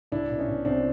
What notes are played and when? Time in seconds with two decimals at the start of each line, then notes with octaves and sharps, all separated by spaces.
0.12 C2 D4 E4
0.30 B2
0.39 C#4 D#4
0.47 B2
0.65 C2 C4 D4